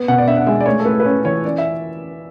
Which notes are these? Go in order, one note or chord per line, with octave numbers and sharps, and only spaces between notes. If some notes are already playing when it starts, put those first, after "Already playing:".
Already playing: B3
B2 F#5
D5
D4 E5
F#5
G#3 E5
D5
A3 C#5
A4
A2 B4
B4
C#4 C#5
E3 C#5
C#4 D5
E5